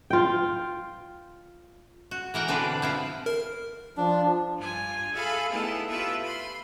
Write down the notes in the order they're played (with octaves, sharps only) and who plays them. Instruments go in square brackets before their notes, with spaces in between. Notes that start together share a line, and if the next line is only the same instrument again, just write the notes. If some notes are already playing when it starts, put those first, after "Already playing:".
[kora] F4 G5
[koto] F#4
E3 A#4 F#5 G5
B2 D3 C4 D4 B4
C4 E4 F4
[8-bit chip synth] A#4
[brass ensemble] F3 [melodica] D4
[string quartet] G2 F4 G#5
G#4 A4 E5 F5 B5
A3 B3 D#4 E4 G#4 A4
E4 F4 G4 A4 B4 E5
B5 C6